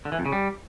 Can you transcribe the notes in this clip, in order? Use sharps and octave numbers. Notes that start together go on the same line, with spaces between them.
D3
E3
F2
C#3
G3